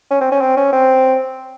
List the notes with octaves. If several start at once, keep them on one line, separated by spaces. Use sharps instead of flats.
C#4
C4
C#4
C4
C#4
C4